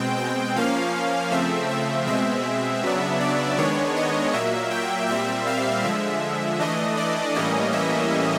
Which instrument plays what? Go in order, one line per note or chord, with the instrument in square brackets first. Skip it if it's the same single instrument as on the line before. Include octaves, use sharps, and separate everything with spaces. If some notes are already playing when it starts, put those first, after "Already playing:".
Already playing: [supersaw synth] B2 G#3 C4 G5
G5
F3 A#3 C#4 F5
C#3 F3 A3 C4 E5
E5
B2 G#3 C4 E5
C#3 F#3 B3 D4
D5
D#3 G#3 B3 D4 C#5
D#5
A#2 F#3 A#3 E5
G5
A#2 G3 C4 E5
F5
D3 F3 G#3 E5
E3 A3 D4 D#5
D5
A2 E3 G3 A#3 C#4 D#5
E5